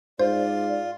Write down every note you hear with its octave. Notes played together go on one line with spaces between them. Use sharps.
G#2 F4 C5 D5